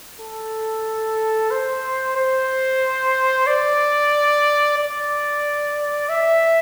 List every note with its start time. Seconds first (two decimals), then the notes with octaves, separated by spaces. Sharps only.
0.20 A4
1.51 C5
2.16 C5
3.47 D5
4.78 D5
6.09 E5